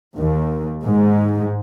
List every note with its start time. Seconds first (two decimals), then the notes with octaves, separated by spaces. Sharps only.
0.17 D#2
0.84 G#2